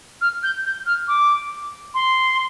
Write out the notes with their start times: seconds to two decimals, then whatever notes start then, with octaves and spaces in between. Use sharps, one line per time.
0.21 F6
0.43 G6
0.65 G6
0.86 F6
1.08 D6
1.94 C6